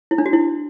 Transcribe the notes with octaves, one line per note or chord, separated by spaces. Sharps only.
E4
D4
F#4
E4